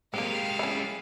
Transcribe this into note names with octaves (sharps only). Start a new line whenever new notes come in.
G#3 A#3 C4 G4 F5
C#4 E4